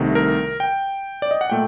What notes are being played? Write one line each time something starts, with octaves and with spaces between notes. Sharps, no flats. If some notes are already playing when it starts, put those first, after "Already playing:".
Already playing: C2 C3 D#3 A3
A#4
G5
D5
D#5
F#5
A#2 A3 G5